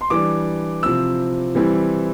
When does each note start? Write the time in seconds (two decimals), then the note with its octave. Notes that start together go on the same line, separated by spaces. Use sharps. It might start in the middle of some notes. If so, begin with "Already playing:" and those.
0.01 C6
0.10 E3 G3 D4 D6
0.83 C3 F3 C4 E4 E6
1.55 E3 G3 C4 E4